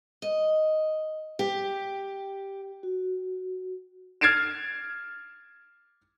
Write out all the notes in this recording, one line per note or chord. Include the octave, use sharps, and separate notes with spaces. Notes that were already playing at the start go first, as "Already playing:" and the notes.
D#5
G4
F#4
F6 G#6 A6 C7 D7 E7